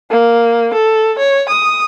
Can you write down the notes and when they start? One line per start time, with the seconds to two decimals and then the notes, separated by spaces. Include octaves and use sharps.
0.11 A#3
0.73 A4
1.18 C#5
1.49 D#6